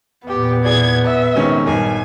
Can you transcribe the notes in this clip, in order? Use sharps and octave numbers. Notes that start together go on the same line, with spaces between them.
E2 A#2 B3 G4
E4 G#4 D5 G#6
E5
C3 D#3 G#3 C#4
D#1 G#1 G2 A#4 G#5